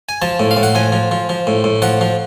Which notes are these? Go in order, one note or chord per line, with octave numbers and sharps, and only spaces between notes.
G#5
F3 A5
A2
F5
A2
F#5
F3 G#5
F3
F3
F3
A2
A2
F3 F#5
F3